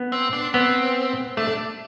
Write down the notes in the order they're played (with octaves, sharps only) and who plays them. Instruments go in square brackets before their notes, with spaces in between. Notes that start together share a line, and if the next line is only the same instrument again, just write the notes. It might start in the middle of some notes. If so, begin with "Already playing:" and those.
Already playing: [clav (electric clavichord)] B3
[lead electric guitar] C4
D4
[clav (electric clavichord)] B3 [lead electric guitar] C4
[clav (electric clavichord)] A3 [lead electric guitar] D4